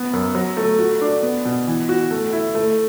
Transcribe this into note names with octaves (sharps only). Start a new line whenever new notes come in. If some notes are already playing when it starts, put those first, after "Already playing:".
Already playing: B3
F#2
F#3
A3
F#4
D4
B3
B2
E3
F#4
A3
E4
A3